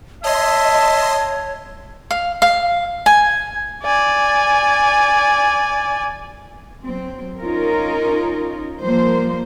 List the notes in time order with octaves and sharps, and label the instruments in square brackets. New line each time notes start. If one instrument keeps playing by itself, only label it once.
[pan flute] C#5 [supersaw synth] D#5 C6 [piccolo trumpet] E5 [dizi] A5
[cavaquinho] F5
F5
G#5
[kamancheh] D5 G#5
[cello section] F#3 C4
C#4 D#4 F4 A#4
F3 G3 A#3 C5